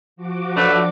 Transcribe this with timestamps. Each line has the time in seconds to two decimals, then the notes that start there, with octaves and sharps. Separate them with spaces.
0.16 F3 F#4 D6
0.57 F#3 A3 D4 B4